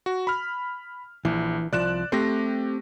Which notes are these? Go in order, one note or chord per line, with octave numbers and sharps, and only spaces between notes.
F#4
B5 F6
A#1 E3
C2 F3 D5 F#6 E7
A3 C4 G4 A#6